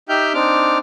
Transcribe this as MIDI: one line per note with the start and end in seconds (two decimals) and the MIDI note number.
0.09 0.33 63
0.09 0.33 67
0.09 0.33 76
0.09 0.33 79
0.09 0.33 89
0.09 0.33 91
0.34 0.78 60
0.34 0.78 62
0.34 0.78 63
0.34 0.78 86
0.34 0.78 89